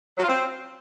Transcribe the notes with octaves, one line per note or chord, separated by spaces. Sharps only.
F#3
F4
C4